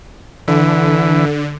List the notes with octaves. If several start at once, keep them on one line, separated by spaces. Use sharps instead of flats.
D3 E3